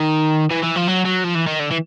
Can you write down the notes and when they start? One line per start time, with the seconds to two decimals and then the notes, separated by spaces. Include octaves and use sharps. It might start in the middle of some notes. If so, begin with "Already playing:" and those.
Already playing: D#3
0.51 E3
0.63 E3
0.75 F3
0.87 F#3
1.05 F#3
1.24 F3
1.35 E3
1.47 D#3
1.59 D3
1.71 E3